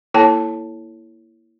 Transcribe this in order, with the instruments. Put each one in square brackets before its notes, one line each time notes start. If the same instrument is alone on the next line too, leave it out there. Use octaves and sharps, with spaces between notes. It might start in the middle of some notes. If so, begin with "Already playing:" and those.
[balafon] A#3 E4 A4 C#5 G5 A5